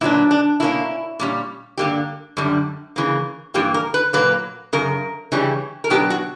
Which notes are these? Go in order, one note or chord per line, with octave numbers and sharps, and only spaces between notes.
A#2 F#3 B3 D4 E4
D4
B2 A#3 C#4 E4
A#2 G3 C#4
G2 D3 A#3 G4
F#2 D3 G3
C#3 E3 A#3
G2 E3 A#3 G4
A#4
B4
A#2 F#3 A#3 B4
F#2 C#3 A#4
C#3 E3 G3 C#4
A#4
B2 F#3 B3 D4 G4
F#4